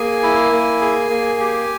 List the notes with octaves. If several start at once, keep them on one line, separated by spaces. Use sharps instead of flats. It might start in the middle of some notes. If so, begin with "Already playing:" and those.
Already playing: A#3 G#4 G#5
E4
A#3
G#4
A#3
G4